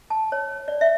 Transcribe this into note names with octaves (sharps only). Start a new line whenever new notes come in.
A5
C#5
D5
E5